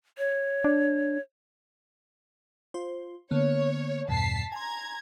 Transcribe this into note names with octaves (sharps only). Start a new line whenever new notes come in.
C#5
D4
F4 C5
D3 A#3 B3 C#5
E2 G2 B2 A5 B6 C7
G#5 A#5 C6 G#6